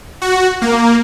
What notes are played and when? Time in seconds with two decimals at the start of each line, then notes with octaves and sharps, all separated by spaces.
0.22 F#4
0.62 A#3